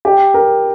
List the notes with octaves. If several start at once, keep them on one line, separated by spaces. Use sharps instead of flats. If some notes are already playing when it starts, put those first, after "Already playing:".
G4
A#4